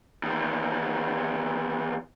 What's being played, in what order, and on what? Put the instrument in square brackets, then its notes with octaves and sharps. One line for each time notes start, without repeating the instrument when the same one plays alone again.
[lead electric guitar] E2 D#3